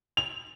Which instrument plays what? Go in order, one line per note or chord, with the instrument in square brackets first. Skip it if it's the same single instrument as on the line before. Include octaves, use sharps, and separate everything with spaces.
[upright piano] F7